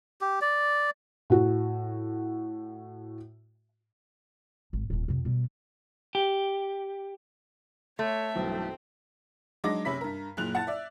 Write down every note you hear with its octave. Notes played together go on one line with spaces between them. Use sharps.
G4
D5
A2 F#4
G#1
D#1 F2
F2 C3
B2 G3
G4
A3 C#5 E5 C6
B1 G2 E3 C4
F#3 G#3 D4 D#4 D6 A#6
F#1 C3 C#4 B5 B6
G2 A#4
F#1 A#2 F#6 F7
F#5 A5 A6
D5 E5